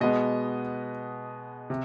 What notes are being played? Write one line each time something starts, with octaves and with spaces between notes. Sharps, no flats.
B2 G#3 B3 D#5
C3